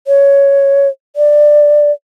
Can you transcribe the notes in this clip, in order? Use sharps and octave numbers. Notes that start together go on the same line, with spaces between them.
C#5
D5